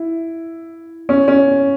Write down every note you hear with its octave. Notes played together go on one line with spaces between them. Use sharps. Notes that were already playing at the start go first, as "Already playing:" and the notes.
Already playing: E4
C#4
C#4